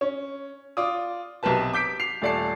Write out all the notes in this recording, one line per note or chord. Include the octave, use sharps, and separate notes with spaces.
C#4
F4 D5 D6 D#6
B1 C3 A#4 B4 A5
D6 G6 B6 D7
C7 F7
D#1 A3 D5 A5 C7